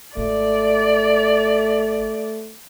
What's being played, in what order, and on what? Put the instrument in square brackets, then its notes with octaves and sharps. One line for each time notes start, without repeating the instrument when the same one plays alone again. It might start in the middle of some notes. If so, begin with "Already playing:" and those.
[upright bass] G#1 [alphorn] A3 [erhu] D5